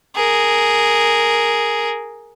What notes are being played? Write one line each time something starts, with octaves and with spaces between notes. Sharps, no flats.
G#4 A#4